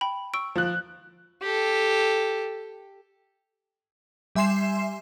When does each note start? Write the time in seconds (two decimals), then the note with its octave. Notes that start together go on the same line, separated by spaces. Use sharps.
0.01 G5 B5
0.34 C#6 E6 D7
0.56 F3 F#6
1.42 G4 A4
4.35 G3 E5 G#5 C6 C7 E7